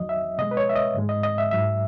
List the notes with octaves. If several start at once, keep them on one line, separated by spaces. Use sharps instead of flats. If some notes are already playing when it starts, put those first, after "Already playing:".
Already playing: E2 D#3 F#3 D#5
E5
B2 G#3 D#5
B4
C#5
E5
D#5
G#2 D#3 G#3
D#5
D#5
E5
G#2 F#3 E5